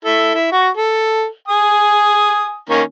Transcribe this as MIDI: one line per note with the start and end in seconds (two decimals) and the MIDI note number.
0.05 0.34 64
0.05 0.34 69
0.34 0.50 64
0.52 0.69 66
0.52 0.69 85
0.77 1.26 69
1.48 2.58 80
1.48 2.58 87
2.69 2.82 51
2.69 2.82 58
2.69 2.82 61